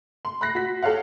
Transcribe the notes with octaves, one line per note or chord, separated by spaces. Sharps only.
C6
B5 F#6 A#6 C7
F#4 B6
G4 A4 C#5 F5 F#5